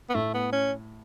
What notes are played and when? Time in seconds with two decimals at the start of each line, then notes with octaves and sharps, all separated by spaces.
0.09 B3
0.14 A2 A3
0.34 B3
0.52 C#4